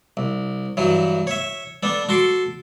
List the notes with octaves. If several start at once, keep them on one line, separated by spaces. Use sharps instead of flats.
C2
G2 E3 F#3
C#5 E5
B3 D4 A4
F#4 A4 C6 D6